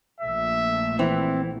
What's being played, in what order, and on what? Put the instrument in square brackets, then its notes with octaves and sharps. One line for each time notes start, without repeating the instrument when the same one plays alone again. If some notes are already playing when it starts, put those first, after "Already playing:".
[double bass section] A#1 A#2 A3 [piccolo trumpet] E5
[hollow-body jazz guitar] E3 B3 [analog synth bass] C4 [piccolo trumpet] E4